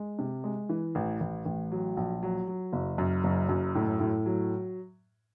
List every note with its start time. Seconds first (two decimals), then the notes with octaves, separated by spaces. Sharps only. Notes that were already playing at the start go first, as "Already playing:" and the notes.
Already playing: G#3
0.19 C3
0.44 G#3
0.69 E3
0.95 A1
1.20 A1
1.45 A1
1.72 F#3
1.97 A#1
2.23 F#3
2.48 F#3
2.73 F#1
2.98 F#2
3.24 F#1
3.49 F#2
3.75 A2
4.00 A2
4.26 F#3